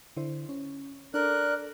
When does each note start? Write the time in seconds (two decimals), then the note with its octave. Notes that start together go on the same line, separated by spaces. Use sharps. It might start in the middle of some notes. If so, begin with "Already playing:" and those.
0.17 D3 E4 C5
0.49 C#4
1.14 D4 A4 A#4 D5 F#6